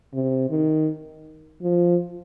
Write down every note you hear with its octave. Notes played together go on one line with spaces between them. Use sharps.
C3
D#3
F3